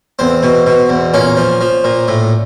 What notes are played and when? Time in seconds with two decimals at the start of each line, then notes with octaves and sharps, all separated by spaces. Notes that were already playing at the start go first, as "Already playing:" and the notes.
0.19 E2 C4
0.43 B2
0.66 B2
0.89 E2
1.14 A#2 C#4
1.37 F3
1.61 F3
1.84 A#2
2.08 A2